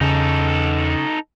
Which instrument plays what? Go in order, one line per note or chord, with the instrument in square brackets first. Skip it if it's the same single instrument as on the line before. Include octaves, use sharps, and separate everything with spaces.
[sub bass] E2 [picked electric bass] C#3 [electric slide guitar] D#4 A4